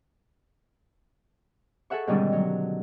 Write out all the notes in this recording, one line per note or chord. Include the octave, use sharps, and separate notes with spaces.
G#4 A4 E5 F#5 C#6
G#2 B2 D3 D#3 G3 C#4
F#3